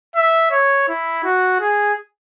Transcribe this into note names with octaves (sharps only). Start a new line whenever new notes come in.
E5
C#5
E4
F#4
G#4